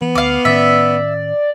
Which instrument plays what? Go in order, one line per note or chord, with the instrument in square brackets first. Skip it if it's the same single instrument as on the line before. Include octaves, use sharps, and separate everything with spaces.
[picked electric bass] E3 [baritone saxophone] B3
[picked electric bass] D2 [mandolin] F5 D6
[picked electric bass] A2 D#3 C#4 [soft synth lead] D5 [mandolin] E5